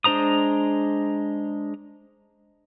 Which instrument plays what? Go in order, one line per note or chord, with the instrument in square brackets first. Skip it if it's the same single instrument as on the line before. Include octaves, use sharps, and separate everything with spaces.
[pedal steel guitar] G#3 D4 C5 A#5 D#6